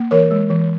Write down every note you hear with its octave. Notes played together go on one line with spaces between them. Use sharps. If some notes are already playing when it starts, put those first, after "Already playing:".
Already playing: A#3
E3 A#4 C#5
G#3
E3